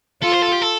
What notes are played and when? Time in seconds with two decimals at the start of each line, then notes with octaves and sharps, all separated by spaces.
0.22 F4 A4
0.32 C5
0.42 A4
0.52 G4
0.61 A4